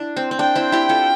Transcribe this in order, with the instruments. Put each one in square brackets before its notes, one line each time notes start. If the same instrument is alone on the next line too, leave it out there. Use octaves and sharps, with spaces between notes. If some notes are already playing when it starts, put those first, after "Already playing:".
Already playing: [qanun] D4 E4
C4
C4
[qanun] D4 [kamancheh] G5
[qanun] C4 E4
E4 G4
F4 A4